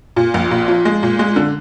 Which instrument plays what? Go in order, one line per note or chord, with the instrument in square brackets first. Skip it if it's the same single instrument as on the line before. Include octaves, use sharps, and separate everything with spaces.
[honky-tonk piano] A#2
A#1
A#2
F3
G#3
A#2
G#3
D3